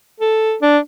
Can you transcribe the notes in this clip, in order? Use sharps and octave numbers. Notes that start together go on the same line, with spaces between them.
A4
D4